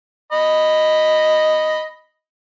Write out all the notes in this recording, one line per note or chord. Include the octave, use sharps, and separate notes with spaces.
D#5 B5